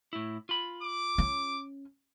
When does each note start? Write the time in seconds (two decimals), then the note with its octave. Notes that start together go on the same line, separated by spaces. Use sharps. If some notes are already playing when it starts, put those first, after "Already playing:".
0.13 A2 E4
0.49 F4 B5
0.83 D6
1.18 C#4